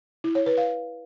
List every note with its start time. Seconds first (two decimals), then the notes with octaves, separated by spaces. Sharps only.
0.24 E4
0.35 C#5
0.46 B4
0.57 F5